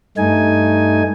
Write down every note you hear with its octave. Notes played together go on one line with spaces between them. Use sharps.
G2 A3 D#4 G#5